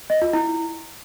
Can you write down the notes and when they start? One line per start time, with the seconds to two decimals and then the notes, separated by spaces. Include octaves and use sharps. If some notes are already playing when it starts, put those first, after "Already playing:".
0.10 D#5
0.22 F4
0.33 E4